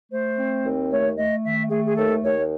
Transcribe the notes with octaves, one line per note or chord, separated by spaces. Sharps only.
A3 C5
C4
D#2
A3 C#5
A3 D#5
D#3 E5
A3 G#4
G#4
D#2 A4
D#2 C#5